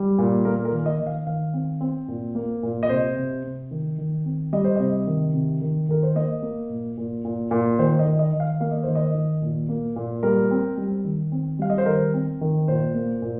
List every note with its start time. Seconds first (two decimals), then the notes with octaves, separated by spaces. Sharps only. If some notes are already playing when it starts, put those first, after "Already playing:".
Already playing: G3
0.18 A#2
0.45 A#3 A#4
0.65 A#4
0.72 D#3
0.86 D#5
1.00 D#3
1.07 F5
1.27 D#3 F5
1.53 C4
1.81 C4
2.08 A#2
2.35 A#3
2.63 A#2
2.83 D#5
2.89 C3 C5
3.16 C3
3.44 C3
3.71 D#3
3.98 D#3
4.25 C4
4.53 G3 D#5
4.64 C5
4.76 C3 D#5
5.07 D#3
5.34 C3
5.61 D#3
5.89 D#3 A#4
6.03 C5
6.15 A#3 D#5
6.42 A#3
6.70 A#2
6.98 A#2
7.25 A#2
7.51 A#2
7.79 D#3 C5
7.99 D#5
8.06 D#3
8.19 D#5
8.33 D#3
8.40 F5
8.60 A#3 F5
8.71 D#5
8.83 D#3 C5
8.95 D#5
9.15 D#3
9.42 A#2
9.69 A#3
9.96 A#2
10.23 G3 A#4
10.51 C4
10.77 G3
11.04 D#3
11.32 C4
11.59 G3 F5
11.70 D#5
11.78 C5
11.86 D#3 A#4
12.14 C4
12.41 D#3
12.68 A#2 C5
12.95 A#3
13.22 A#2